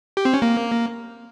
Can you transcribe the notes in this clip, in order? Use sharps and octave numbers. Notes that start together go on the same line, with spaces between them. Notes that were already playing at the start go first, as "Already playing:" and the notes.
G4
C4
C#4
A#3